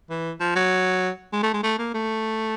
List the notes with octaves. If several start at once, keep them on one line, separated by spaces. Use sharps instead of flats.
E3
F3
F#3
G#3
A3
G#3
A3
A#3
A3